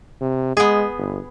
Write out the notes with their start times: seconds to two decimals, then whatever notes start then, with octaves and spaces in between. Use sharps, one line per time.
0.21 C3
0.57 G#3 B3 G#4
0.98 G1